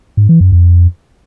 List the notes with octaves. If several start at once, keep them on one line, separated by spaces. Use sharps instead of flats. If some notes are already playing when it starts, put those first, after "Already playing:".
G#2
E3
F#2
F2